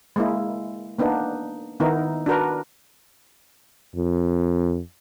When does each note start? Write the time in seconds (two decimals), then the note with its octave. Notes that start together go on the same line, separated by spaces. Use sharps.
0.16 G#3 A#3 E4
0.99 A#3 B3 D4 D#4
1.80 D#3 B3 D#4 E4 A#4
2.26 D4 F#4 A#4 B4
3.95 F2